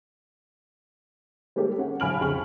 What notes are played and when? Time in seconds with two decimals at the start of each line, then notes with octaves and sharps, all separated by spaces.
1.56 G3 G#3 A#3 G4 A4
1.78 C#4 F#5
2.00 B1 G#5 B5 F6 D7 F#7
2.20 F2 C#3 G5 B5 C#6 F#7